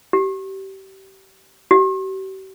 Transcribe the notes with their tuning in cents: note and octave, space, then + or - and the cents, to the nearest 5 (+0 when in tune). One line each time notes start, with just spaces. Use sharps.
G4 -30
G4 -45